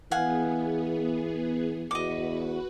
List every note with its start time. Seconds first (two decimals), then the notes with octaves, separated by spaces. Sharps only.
0.11 E3 B3 G#4 F5 F#5 G#5
1.91 E2 F#4 B4 D#5 D6